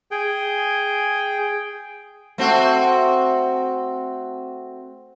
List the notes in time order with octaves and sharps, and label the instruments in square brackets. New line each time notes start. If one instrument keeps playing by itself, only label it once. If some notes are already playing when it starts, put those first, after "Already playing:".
[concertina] G#4 G5
[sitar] A3 C4 F#4